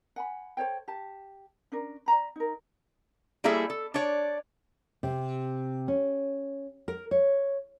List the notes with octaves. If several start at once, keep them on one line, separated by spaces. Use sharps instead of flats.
F#5 G#5 B5
A4 C5 C#5 G5
G4 A5
C#4 D4 A#4
D5 E5 A#5 B5
D#4 A#4
G3 A#3 E4 G#4 A4 E5
A4
D4 C#5 D5
C3
C#4
A#4
C#5